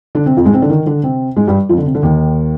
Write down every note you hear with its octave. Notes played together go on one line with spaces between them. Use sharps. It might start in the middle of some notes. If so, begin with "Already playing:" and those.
D3 D4
C3 C4
F2 F3
G#2 G#3
C3 C4
D3 D4
D#3 D#4
D3 D4
C3 C4
G#2 G#3
G2 G3
F2 F3
D3
C3
D3
D#2 D#3